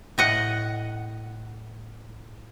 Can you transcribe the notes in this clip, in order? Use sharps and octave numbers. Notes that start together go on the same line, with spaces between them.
A2 D#5 F#5